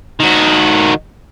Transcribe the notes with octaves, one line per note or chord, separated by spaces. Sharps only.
D#3 F#4